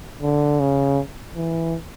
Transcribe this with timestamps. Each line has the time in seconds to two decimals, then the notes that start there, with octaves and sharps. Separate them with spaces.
0.22 D3
0.60 C#3
1.36 E3